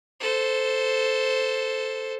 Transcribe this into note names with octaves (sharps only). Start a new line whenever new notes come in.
A4 C5